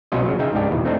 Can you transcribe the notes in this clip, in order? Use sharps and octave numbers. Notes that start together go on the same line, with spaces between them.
C2 B2 F#3 C#4 F4 D#5
C#3 F#3
C#3 D#4 E5 G5 G#5
C#2 G#2 D4 G4
E2 B2
A3 C4 D4 D#4